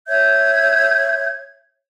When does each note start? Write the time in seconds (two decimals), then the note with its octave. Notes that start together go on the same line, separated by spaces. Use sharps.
0.08 C#5 E5 G6 G#6